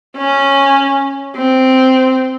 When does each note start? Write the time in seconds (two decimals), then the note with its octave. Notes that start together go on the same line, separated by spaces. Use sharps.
0.17 C#4
1.37 C4